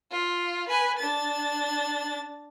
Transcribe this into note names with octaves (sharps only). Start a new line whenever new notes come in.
F4
B4 G#5
D4 A6